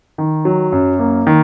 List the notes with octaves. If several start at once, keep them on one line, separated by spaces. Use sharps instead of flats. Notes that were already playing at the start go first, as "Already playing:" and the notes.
D#3
F#3
F#2
A#3
D#3